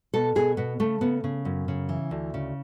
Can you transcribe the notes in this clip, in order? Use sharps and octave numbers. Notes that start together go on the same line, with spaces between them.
B2 A4
B2 G#4
B2 B3
C#3 A3
C#3 B3
C#3
F#2
C#3
E3
D2
C#3